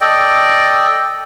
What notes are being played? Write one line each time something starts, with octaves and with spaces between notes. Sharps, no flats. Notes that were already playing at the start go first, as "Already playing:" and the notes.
A4 D5 D#5 G5